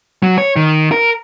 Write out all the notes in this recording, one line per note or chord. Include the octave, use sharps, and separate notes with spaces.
F#3
C#5
D#3
A#4